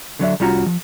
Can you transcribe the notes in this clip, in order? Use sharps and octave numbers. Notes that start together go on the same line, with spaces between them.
D3 F#3 D4 E5
C2 G3 C#4 F4 F#4 A#5
F3